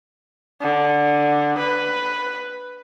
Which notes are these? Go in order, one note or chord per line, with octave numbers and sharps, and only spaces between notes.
D3
B4